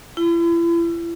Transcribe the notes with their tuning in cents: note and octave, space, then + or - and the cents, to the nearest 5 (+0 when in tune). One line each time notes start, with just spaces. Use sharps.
E4 +40